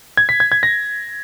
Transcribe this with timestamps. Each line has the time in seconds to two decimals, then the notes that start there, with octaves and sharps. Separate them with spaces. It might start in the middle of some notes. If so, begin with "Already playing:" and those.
0.17 G#6
0.29 B6
0.40 G#6
0.52 G#6
0.63 A#6